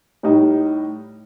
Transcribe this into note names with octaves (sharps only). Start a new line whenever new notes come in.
A2 G3 D#4